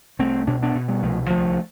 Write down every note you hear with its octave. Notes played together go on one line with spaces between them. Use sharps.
C2 A3 C4
B2 D4
B3 D4
B2
G3 B3
C2 F3 A3
D2 F3 A3